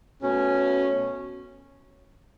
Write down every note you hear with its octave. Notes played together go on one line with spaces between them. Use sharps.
B2 A3 C#4